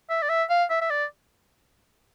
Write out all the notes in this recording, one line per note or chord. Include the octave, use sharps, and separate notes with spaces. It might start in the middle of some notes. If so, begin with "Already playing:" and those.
E5
D5
E5
F5
E5
E5
D5